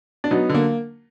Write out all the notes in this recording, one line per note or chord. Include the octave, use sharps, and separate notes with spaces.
D4
F#3 B3 D#4
D3
A#3